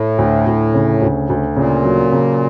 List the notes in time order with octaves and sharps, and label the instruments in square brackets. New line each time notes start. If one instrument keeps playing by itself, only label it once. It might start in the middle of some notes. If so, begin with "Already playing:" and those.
Already playing: [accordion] A2
[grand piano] D2
D2
C#3
D2
D2
[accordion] A#2 [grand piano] C#3
[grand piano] F#3
C#3